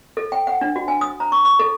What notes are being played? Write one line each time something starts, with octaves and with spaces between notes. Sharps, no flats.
A4
G5
F#5
D4
F#4
G#5
D#6
A#5
C#6
C#6
A4